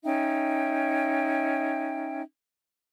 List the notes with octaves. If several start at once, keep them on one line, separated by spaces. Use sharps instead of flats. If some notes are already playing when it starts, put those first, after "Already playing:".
C#4 D#4 E5 G5